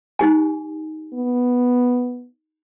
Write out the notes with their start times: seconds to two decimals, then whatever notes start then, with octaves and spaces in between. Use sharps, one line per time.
0.19 D#4 G4 G#5
1.14 B3